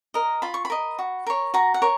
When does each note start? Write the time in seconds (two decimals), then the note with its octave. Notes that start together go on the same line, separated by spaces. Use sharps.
0.14 A#4 D#5
0.42 F4 B5
0.54 C#6
0.65 B5
0.70 A#4 D#5
0.99 F#4
1.27 A#4 C#5
1.54 F#4 A#5
1.74 F#5
1.82 A#4 C#5